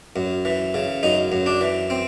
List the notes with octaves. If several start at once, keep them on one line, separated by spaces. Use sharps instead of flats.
F#2
E3
C#3
F#2 D#4
F#2
D4
E3
C4